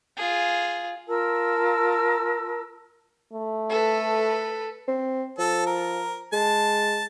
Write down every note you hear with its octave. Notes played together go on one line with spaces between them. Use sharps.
F4 G#4
F4 A#4 A5 E6
A3
A4 B4
C4
F3 A4
A#4
G#3 A5